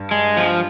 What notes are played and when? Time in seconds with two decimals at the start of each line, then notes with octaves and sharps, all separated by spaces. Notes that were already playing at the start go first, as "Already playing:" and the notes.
Already playing: G2
0.11 G#3
0.37 F3